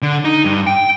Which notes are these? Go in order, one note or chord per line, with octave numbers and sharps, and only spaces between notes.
D3
D#4
G2
G5